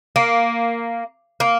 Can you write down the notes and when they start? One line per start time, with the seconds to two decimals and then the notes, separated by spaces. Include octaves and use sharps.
0.16 A#3
1.40 A#3